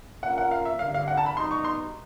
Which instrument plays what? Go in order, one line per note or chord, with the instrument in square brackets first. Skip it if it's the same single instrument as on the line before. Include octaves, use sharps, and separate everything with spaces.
[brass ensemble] A#3 C#4 F4 A#4 [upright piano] F#5
[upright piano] F#5
F5
E5
[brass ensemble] D3 G3 A#3 [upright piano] F5
[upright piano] F5
F#5
A5
B5
[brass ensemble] B2 G3 B3 D#4 [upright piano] C6
[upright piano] C#6
C6